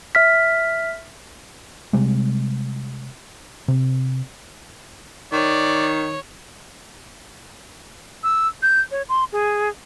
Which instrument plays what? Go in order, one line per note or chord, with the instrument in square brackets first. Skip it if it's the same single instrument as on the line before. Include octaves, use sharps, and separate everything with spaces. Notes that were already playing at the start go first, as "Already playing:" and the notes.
[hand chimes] E5 F6 B6
[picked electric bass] C3 G3 G#3
C3
[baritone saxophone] D#3 [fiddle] C#5 [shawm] D5
[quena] E6
G6
C#5
C6
G#4